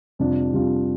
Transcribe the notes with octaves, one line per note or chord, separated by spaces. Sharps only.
F2 C3 G3 D4 F4
F2 C3 G3 D4 F4